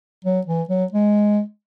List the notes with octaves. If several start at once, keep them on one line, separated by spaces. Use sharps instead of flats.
F#3
E3
F#3
G#3